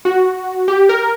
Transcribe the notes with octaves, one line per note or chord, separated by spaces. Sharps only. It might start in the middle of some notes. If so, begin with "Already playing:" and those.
F#4
G4
A#4